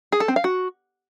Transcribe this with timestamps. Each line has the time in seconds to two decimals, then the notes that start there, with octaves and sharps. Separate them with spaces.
0.12 G#4
0.20 A4
0.28 C4
0.36 F5
0.44 F#4